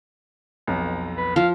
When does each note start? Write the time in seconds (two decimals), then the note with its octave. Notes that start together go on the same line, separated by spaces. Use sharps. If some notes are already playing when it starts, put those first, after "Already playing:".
0.67 B1 F2
1.17 B4
1.36 F3 F5